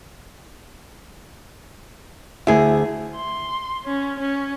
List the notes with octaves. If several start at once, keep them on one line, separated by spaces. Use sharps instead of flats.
D2 E4 G#4
C6
C#4
C#4